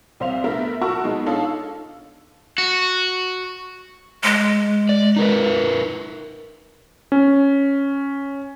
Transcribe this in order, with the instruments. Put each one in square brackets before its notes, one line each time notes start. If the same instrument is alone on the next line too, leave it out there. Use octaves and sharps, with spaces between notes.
[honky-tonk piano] C2 C3 C5 E5 F5 F7
A3 B3 D4 A#4 E5
F#4 A#4 F#5 A5 C#6 E6
B2 G#3 B3 D#4
D4 D#4 F4 A4 C#5 F5
[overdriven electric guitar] F#4
[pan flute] G#3
[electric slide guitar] D5
D#4 A#4 B4
[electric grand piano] C#4